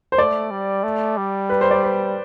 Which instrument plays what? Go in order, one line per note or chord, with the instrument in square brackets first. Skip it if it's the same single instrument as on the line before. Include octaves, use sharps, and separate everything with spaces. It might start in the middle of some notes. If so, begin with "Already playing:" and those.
[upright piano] C5
[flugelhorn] A3 [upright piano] D5
[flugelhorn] G3
A3
G3
[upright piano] B4
C5
D5
B4